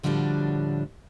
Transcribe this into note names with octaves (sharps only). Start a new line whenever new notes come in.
A2 D3 F3 G3 D4 F#4